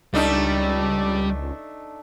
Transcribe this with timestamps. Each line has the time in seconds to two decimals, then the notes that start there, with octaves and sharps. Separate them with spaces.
0.14 C#2 G3 A3 D4 D#4